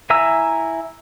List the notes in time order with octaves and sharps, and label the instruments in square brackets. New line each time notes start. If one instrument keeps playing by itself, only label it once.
[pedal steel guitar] E4 E5 G#5 A#5 E6